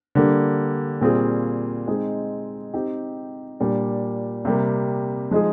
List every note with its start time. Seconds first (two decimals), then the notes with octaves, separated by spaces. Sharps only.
0.15 D3 G3 A#3
1.01 A#2 G3 C4 F4 G#4
1.87 G#3 C4 D#4 G#4
2.74 C4 D#4 G4
3.60 A#2 G3 D4
4.45 C3 G3 A#3
5.31 F3 G#3 D#4 G#4